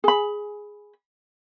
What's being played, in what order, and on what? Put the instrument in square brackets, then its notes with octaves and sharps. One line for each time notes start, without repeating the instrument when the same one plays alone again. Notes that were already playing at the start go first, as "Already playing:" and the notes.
[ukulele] G#4 B5